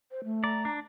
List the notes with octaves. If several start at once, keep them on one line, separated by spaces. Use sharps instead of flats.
C5
A3
D5 A#5
D4